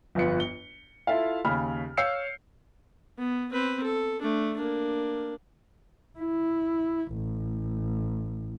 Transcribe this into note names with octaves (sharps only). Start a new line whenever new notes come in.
G1 F2 B3 F4 B4 C#7
G7
E4 F4 A4 E5 F5
D#2 C#3 B5 F6
C#5 F5 E6 G6 C7 C#7
B3
C4 B4
A4
A3 D4
A#3 D4
E4
A1